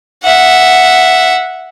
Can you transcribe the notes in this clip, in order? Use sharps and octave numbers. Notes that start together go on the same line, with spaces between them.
E5 F#5